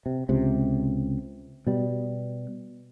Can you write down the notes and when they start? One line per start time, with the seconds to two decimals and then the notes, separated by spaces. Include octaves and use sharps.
0.06 C3
0.29 C#2 C3
1.67 B2 G3